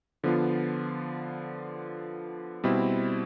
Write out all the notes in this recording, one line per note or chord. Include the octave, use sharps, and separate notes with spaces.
D3 F3 B3 F4
B2 G3 C4 E4